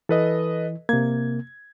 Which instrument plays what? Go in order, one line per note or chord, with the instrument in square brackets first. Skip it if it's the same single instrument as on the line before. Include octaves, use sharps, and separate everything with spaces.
[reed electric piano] E3 [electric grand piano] A4 B4 D#5
[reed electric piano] C3 A#3 [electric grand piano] G#6